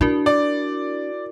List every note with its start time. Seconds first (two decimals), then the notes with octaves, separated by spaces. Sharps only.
0.01 D4 E4 F#4 A#4
0.26 D5